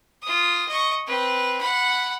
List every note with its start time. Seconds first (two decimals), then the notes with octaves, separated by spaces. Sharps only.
0.22 F4 D#6
0.68 D#5 C#6
1.06 C4 B4
1.61 F#5 B5